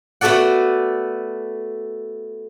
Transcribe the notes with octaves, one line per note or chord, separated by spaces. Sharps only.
A3 B3 F#4 A4 D5 F#5